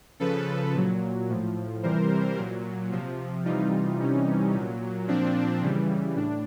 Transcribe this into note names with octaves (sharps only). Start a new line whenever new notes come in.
C#3 F3 A4 B4
A#2 F#3
A2 F3
C3 E3 G3 A#4 C5
A#2 F#3
C3 F3
C3 E3 G3 D#4 F4
C3 E3 G3 C#4 D#4
A#2 F#3
A#2 F3 C4 D4
C#3 E3 G3
A2 D4